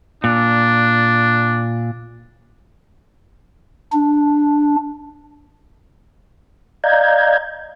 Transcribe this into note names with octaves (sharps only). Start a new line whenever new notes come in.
A#2 D4
D4
D5 D#5 F5 A#5 G6 G#6